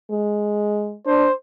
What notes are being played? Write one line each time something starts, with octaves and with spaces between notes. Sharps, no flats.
G#3
D4 C5